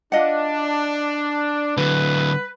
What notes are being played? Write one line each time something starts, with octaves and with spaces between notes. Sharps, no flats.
D4 F4 D#5 F#5
D3 F#3 B4